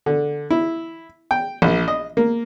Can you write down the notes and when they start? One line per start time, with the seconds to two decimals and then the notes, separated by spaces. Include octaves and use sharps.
0.06 D3
0.50 E4
1.31 G5
1.62 A#1
1.88 D#5
2.17 A#3